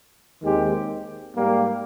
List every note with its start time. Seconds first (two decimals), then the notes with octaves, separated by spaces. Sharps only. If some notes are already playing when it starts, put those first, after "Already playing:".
0.42 D#2 D#3 G#3 C4 G4
1.33 G#2 G3 A#3